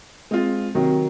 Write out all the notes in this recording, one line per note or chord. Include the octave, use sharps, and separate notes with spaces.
G#3 C4 F4
C3 D#3 F#3